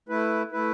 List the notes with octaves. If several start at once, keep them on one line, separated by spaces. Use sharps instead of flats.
A3 E4 B4
A3 E4 B4